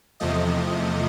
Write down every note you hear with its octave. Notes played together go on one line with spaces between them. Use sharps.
E2 C3 F3 A3 D#5